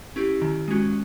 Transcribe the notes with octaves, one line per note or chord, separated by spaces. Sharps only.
C#4 E4 G4
D#3
G#3 C#4 F#4